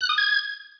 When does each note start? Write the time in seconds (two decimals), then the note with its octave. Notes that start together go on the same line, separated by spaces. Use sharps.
0.01 F#6
0.09 D#6
0.18 G#6